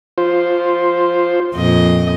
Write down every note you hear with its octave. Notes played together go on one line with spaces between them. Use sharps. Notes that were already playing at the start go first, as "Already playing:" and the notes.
F4 C5
F2 A#2 D#5